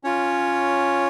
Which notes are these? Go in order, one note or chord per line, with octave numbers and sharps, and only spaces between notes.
C#4 F4 C#5